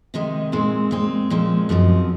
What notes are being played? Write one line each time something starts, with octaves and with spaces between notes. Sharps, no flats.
C3 D#3 G#3 D#4
A#2 G#3 C4 D#4
A#2 G#3 C4
A#2 F3 G#3 C4
F#2 F3 C4 D#4